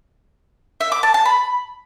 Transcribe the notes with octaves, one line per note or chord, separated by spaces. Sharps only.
E5
D6
A5
A5
B5